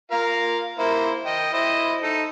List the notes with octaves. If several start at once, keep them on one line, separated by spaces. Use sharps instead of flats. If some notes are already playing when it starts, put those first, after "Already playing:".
F4 A#4 F5
A#3 E4 C5
D#5 G5
E4 C5 D#5
D#4 A4